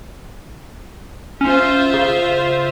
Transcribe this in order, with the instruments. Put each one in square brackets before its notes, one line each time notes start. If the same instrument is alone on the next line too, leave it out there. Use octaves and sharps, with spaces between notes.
[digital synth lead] C#4 [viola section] F4 C5 E5
[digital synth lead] C#3